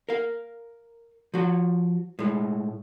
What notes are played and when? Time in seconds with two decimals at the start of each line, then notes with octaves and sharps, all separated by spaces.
0.09 A#4 F5
1.34 F3 F#4
2.19 A2 G#3